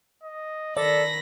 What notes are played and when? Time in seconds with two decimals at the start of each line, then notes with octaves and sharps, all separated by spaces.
0.23 D#5
0.77 D#3 A4 D5 B5 A#6